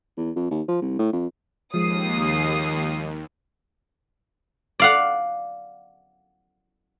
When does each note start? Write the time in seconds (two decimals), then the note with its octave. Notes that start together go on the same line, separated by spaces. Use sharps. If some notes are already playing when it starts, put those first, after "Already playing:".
0.17 E2
0.36 F2
0.51 D#2
0.68 F3
0.82 C2
0.99 A2
1.13 F2
1.74 D#2 F3 G#3 D#6 C7
4.80 D5 F5 F#5